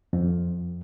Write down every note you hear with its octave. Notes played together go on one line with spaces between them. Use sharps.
F2